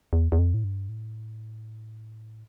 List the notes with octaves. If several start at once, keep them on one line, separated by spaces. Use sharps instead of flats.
E2
E2
F2
A2
G2
A2